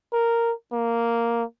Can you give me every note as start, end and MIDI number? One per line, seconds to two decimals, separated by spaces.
0.13 0.52 70
0.73 1.44 58